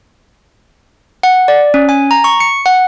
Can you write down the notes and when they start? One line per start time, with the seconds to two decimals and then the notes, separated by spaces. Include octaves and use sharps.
1.23 F#5
1.48 D5
1.74 C#4
1.89 G#5
2.11 A#5
2.24 C#6
2.40 C#7
2.66 F#5